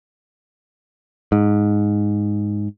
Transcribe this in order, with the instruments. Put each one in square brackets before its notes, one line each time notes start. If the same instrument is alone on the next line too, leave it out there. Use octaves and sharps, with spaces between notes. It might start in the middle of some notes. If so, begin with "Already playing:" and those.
[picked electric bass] G#2